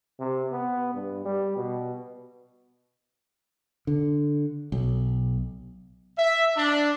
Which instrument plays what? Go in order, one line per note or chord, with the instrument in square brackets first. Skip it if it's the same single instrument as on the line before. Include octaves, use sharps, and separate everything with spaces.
[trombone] C3
B3
G2
G3
B2
[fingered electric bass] D3
B1
[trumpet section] E5
D4